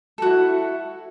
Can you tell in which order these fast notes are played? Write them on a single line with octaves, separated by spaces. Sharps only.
A4 F#4 E4